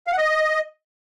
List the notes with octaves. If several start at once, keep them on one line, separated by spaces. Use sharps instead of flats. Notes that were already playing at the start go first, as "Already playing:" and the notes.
F5
F#5
D#5